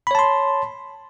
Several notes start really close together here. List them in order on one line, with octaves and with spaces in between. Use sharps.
B5 C#5 A5 C6